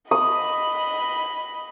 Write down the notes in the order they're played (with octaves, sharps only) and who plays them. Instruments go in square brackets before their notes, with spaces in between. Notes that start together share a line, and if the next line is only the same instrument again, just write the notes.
[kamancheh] D#5 B5 [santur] D#6